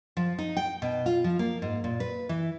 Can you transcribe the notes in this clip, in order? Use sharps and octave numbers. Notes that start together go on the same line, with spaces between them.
F3
D#4
G5
B2
F4
F3
A#3
G#2
A#2
B4
E3